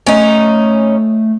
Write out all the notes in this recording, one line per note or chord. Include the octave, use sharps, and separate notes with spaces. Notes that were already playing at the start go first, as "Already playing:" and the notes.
A3 C#4 D#4